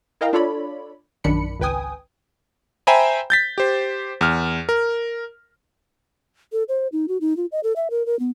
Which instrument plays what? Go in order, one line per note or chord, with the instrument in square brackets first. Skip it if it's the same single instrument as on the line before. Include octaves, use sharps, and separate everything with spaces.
[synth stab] E4 A#4 D#5 F5 G5 A#5
D4 F4 A4 C#5 D5 B5
A#1 F#2 D#3 D4 B5 C#7
G#1 C#2 B4 G5 G#5 D#6
[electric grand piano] C5 E5 G5 G#5 A#5 B5
G6 A6 B6
G4 C5
E2 F6
A#4
[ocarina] A4
C5
D#4
F#4
D#4
F4
D#5
A4
E5
A#4
A#4
B3